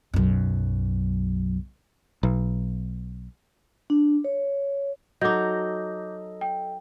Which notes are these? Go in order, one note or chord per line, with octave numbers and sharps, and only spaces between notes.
B1 F#2
B1
D4
C#5
F#3 D#4 A4 D#5 D6 G6
G5